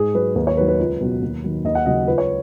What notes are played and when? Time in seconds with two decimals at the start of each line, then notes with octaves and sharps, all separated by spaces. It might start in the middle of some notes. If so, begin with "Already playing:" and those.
Already playing: G#2 G#4
0.14 F#3 B4
0.36 D#2 B4
0.47 C#5
0.57 D#3 F#3 B4
0.68 B4
0.79 C#2
1.00 B2 F#3
1.22 D#2
1.44 D#3 F#3
1.64 D#2 D#5
1.75 F#5
1.86 C#3 F#3 D#5
2.08 C#2 B4
2.18 C#5